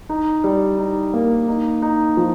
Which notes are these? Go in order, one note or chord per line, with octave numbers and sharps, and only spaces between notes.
D#4
G3
D#4
A#3
D#4
D#4
F3